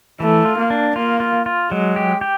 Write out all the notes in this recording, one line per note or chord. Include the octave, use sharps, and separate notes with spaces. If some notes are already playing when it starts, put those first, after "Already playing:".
E3 A3
F4
A#3
D4
A#3 F4
F4
F4
F#3 G#3
G4
G4